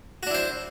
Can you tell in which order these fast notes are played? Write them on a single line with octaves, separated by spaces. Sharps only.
F#4 D4 E4 C5